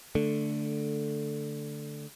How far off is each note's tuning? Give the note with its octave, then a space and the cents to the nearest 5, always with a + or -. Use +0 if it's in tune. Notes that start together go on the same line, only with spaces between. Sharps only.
D3 +0 A3 +0